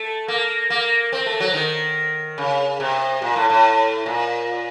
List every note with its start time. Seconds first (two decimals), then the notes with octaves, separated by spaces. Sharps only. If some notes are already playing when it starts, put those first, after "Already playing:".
Already playing: A3
0.28 A#3
0.70 A#3
1.13 C4
1.26 A3
1.40 F#3
1.54 D#3
2.38 C#3
2.80 C3
3.22 A#2
3.36 A2
3.50 A2
4.06 A#2